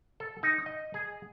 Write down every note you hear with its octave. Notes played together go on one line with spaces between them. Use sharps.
A4
D#4
D#5
G#4